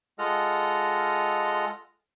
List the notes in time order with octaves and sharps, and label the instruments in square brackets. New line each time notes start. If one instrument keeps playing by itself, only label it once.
[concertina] G#3 F4 A4 D#5 F#5 F6